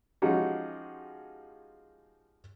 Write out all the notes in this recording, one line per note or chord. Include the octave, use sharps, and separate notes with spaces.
F3 G#3 C#4 D#4 F#4 G4